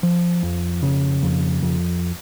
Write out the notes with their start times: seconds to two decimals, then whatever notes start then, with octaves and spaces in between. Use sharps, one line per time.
0.03 F3
0.43 F2
0.83 C#3
1.23 F2
1.62 F2